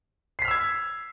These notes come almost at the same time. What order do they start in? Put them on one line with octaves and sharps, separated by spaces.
C7 B6 F6 E6 G#6